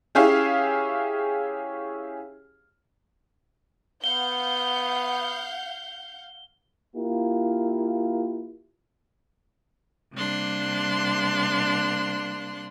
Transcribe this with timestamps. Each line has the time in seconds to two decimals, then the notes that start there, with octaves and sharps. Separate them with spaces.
0.15 C#4 E4 G4 G#4 C#5 F5
4.04 B3 F5 F#5 G6 G7
6.96 A#3 E4 F4 G4
10.14 C3 G3 A#3 D4 C6 F#6